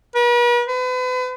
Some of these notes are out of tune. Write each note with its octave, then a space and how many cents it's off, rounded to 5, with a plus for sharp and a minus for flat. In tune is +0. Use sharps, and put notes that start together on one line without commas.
B4 -45
B4 +40